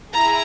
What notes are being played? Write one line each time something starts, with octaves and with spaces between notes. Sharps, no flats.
E4 G#4 A#5